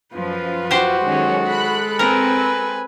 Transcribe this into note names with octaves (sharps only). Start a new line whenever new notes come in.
F#2 F3 F4 B4
F#4 G4 C5
D#3 F#3 G#3 C#4 A4
B5 F#6
C4 A#4 B4 G#5